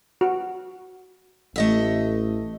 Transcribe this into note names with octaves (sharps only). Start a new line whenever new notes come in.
F#4
A1 A3 D#5 E5